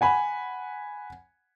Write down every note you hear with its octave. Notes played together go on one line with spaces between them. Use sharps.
F#5 G#5 B5